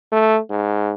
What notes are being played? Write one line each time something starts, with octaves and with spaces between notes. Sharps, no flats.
A3
G#2